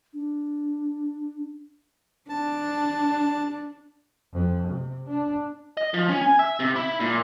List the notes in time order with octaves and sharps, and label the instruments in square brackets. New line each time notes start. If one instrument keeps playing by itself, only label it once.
[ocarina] D4
[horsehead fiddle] D4 [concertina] A5
[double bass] F2
C3
D4
[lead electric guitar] D#5
F3
C#4
G#5
E5
C3
E4
A#2